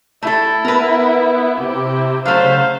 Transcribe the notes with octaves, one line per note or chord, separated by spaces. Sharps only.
A3 E4 A4
B3 A#4 B4
C3 E4 G4
C#3 F#3 A3 C5 F5